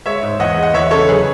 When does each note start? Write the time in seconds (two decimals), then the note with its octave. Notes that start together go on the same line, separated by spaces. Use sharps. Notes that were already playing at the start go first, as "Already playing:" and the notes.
0.05 G#3 C#5 E5
0.22 G#2
0.40 E2 D#5 F#5
0.57 G#3
0.63 F#5
0.74 E2 C#5 E5
0.91 C#3 A4 C#5
1.08 F#3 G#4 B4